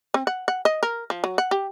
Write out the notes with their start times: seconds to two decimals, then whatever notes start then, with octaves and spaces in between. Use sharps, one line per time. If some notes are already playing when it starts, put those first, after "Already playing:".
0.14 C4
0.27 F#5
0.48 F#5
0.65 D#5
0.83 A#4
1.10 F3
1.24 F#3
1.38 F#5
1.51 G4